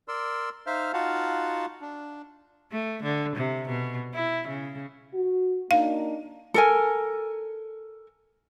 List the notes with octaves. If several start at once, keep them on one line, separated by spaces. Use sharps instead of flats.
A#4 D5 C6 E6
D#4 C5 E5 F5 F6
D#4 F4 F#4 F5 F#5 A5
D4
A3
D3
C3
B2
E4
C#3
F#4
A#3 D4 D#4 F5
A4 A#4 G#5